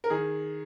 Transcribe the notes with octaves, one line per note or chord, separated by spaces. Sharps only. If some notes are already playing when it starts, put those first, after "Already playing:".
A#4
D#3 G#4